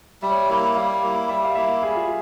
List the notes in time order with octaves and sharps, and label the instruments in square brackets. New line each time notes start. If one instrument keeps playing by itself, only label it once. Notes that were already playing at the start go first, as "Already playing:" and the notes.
[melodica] G3 [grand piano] E5
[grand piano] C#5
E5
[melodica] A#3 E4
[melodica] G3 [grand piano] F5
[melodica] A#3 E4
[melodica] G3 [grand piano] E5
[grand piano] F5
[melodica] A#3 E4 [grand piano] E5
[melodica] G3 [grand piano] G#4
[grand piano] F4